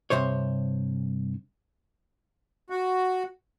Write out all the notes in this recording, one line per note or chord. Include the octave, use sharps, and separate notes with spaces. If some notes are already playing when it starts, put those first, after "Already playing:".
G2 C3 C5 C#5
F#4